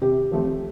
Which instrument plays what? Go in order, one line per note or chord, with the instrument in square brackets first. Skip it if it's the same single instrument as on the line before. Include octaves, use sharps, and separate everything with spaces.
[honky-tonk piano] C3 [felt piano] G4
[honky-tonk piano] F3 A3 C4